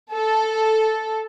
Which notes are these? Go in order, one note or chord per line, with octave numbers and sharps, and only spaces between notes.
A4